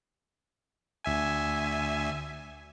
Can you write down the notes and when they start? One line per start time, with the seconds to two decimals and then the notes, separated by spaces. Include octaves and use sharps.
1.04 D2 E5 G#5